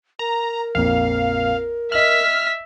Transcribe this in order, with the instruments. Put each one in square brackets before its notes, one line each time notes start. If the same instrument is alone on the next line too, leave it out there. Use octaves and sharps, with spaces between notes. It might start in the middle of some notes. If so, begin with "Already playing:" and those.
[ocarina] A#4 [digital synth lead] A#5
[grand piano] A#1 F2 A#3 [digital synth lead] F5
[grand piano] D#5 F#7 [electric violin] E5 B6 [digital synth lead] F6